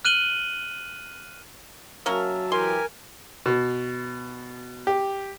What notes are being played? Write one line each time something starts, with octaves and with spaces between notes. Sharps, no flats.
F6 F#6 D#7 F#7 G7
F#3 A#3 C#4 A#4 E5 A5
E3 G4 A#4 G#5 C6
B2
G4